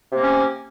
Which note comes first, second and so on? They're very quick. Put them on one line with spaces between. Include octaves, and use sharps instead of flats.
C3 A#3 C#4